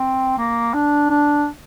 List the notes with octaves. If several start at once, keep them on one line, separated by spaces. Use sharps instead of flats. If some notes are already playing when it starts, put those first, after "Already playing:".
Already playing: C4
A#3
D4
D4